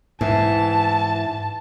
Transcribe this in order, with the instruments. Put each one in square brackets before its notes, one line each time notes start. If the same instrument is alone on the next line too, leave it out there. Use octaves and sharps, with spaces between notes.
[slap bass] G#2 [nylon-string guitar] E3 [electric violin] A5